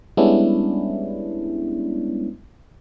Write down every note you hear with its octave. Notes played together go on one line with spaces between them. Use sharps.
G3 G#3 B3 C#4 D4 E4